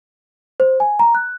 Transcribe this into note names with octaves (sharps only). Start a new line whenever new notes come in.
C5
G#5
A#5
F#6